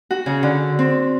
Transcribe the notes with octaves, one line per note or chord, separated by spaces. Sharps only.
F#4
C#3
D3
C4